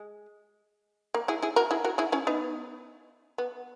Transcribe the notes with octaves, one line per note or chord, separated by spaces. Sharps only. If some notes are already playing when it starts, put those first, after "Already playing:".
Already playing: G#3
A#3
E4 G#4
E4 G#4
F#4 A#4
E4 G#4
F#4 A#4
E4 G#4
C#4 E4
B3 D#4
B3